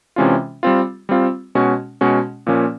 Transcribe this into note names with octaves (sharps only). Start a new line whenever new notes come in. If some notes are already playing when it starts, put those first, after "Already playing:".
C3 E3 G#3 C#4 F4
G3 C4 F4
G3 C4 F4
B2 G#3 C#4 F#4
B2 G#3 C#4 F#4
A#2 F3 A#3 C#4